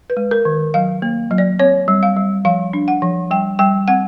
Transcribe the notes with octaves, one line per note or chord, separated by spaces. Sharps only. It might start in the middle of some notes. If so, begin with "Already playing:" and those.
B4
G#3
A#4
D#3
F#3 F5
A#3
F#3
D5
C4 C#5
G3
F5
G3
F3 F5
D4
F#5
F3
G3 G5
G3 G5
C4 F#5